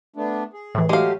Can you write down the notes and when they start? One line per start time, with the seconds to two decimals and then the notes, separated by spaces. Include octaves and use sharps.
0.16 A3 B3 D4
0.53 G#4
0.75 A2 E3
0.89 F#3 G#3 A3 G4 F5